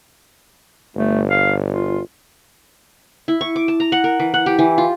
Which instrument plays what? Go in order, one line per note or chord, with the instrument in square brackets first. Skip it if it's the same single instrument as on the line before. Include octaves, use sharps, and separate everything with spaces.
[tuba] G1 [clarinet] A3
[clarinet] F5
F4
[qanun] E4
C#6
D6
A5
A#5
F#5
A#4
E3
F#5
G4
E3
F4